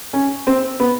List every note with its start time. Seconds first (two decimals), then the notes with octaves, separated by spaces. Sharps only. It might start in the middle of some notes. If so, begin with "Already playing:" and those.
0.13 C#4
0.47 C4
0.80 B3